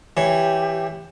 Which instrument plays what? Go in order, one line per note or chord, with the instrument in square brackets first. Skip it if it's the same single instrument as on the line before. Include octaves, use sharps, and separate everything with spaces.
[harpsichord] E3 C#5 [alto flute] G4